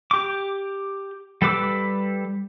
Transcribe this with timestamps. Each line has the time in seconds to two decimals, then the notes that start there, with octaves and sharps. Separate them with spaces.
0.11 G4 D6
1.42 G3 A4 B4 D6 E6